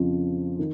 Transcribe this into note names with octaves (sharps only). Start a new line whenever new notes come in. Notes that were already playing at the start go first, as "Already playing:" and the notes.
Already playing: F2 C#3 F3
D#3